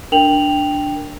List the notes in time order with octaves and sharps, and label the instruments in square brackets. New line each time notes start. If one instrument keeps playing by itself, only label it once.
[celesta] D4 A#4 G5 F7 F#7